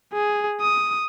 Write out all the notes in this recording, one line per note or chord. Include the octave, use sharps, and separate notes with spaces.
G#4
D#6